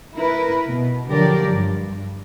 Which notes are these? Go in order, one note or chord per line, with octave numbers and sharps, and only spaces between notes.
E4 A#4 B4
B2
D3 F3 F#3 G4 A#4 D5
G2